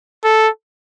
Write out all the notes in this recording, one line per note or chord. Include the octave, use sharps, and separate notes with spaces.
A4